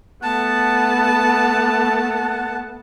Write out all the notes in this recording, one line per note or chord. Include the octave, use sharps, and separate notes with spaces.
A3 B3 F#5 A5